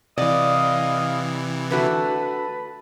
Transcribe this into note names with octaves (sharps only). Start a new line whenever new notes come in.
C3 E3 D5 D#5 F5
D3 A3 F#4 B4 A5